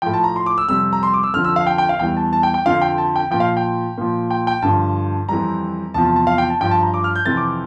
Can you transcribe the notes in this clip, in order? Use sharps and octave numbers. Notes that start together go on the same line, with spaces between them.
A2 F3 G5
A5
A#5
C6
D6
E6
F2 C3 G3 E6
A#5
C6
D6
E6
F2 D3 F3 F6
E6
F5
G5
G5
F5
E2 E3 G3 G5
A5
A5
G5
G5
F2 D3 F3 F5
G5
A5
G5
A#2 F3 G5
F5
G5
A#2 F3
G5
G5
G2 D3 F3 A5
F2 E3 G3 A#5
E2 C3 F3 A5
A5
A5
F5
G5
A5
G2 F3 G5
A5
A#5
D6
F6
G6
F2 C3 E3 A6
D6